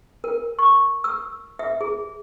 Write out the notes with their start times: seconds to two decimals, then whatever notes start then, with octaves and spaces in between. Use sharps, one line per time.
0.24 A#4
0.59 C#6
1.04 E6
1.59 E5
1.81 G#4